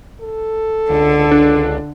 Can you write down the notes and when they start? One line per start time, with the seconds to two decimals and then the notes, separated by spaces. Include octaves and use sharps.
0.21 A4
0.90 C#2 D3
1.31 D4